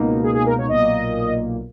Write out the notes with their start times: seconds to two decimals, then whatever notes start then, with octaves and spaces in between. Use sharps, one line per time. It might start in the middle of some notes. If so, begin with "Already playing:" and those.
Already playing: C#2 B2 A#3 D#4
0.23 G#4
0.35 G#4
0.46 A#4
0.58 C#5
0.69 B1 A#2 A#3 D#5